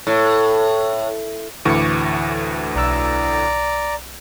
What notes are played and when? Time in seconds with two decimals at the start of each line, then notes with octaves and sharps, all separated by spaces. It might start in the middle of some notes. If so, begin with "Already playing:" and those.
0.07 A2
1.65 D2 A2 E3 C#6 D6 C#7
2.75 B1 D5 A#5 E6